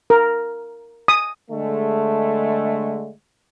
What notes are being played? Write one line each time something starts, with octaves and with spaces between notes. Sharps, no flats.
A#4
D#6
D3 G#3 A3